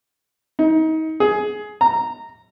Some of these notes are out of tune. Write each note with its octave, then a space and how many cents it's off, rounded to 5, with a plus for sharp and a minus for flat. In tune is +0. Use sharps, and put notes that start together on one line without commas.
D#4 +30
G#4 +15
A#5 -15